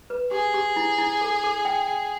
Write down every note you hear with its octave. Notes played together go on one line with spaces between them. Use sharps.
B4
G4 G#4
G4
E4
E4
A4
A4
G5
G5